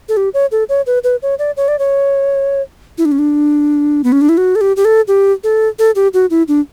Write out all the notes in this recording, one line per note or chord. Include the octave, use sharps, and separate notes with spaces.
A4
G4
C#5
A4
C#5
B4
B4
C#5
D5
C#5
D5
C#5
E4
D4
C#4
D4
B3
C#4
D4
E4
F#4
A4
G4
G4
A4
G4
A4
A4
G4
F#4
E4
D4